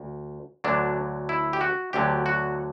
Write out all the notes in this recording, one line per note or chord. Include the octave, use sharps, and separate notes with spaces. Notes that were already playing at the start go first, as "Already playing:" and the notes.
Already playing: D2
D2 D3 F#3 D4
E4
G4
F#4
D2 D3 F#3 G4
F#4